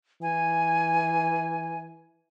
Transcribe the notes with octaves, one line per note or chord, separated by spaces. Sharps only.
E3 G#5